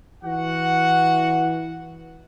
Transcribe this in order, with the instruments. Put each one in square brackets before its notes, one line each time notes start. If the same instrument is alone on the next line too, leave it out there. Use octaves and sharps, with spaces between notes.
[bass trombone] E3 [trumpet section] F#4 F#5